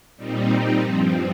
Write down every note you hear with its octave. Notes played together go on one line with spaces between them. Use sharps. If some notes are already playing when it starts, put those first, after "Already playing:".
A#2 G3 C4 D#4
G2 F3 C4